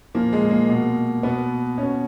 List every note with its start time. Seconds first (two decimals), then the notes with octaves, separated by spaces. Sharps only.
0.15 A#2 F3 A#3
0.33 G#3
0.51 A#3
0.69 B2
1.23 B2 B3
1.78 B2 C#4